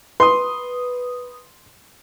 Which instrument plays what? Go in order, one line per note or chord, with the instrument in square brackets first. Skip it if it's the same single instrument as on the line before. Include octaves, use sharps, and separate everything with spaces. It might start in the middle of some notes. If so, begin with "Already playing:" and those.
[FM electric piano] B4 D#6 [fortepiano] C6